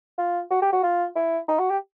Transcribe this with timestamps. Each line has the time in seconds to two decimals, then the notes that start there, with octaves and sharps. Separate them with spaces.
0.18 F4
0.51 F#4
0.62 G4
0.72 F#4
0.83 F4
1.16 E4
1.48 D#4
1.59 F#4
1.70 G4